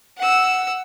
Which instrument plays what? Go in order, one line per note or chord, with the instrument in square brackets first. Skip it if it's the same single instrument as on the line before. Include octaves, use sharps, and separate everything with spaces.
[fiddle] F#5 E6